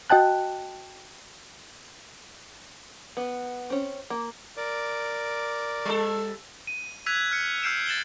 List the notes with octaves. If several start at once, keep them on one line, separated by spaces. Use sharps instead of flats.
F#4 D#5 G5 A5 F#6
B3
C4 C#4
A#3
A#4 D5 D6
G3 A4
D#7
E6 F#6 G#6 B6 D#7 F7
F6 C#7
E6 F6 G6 C7 D7 E7
A6 E7 F#7 G7